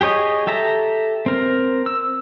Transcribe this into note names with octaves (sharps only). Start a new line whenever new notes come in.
G4 G#4 C#5 D#5
G4 A4 E5 A#5
C4 A#4
E6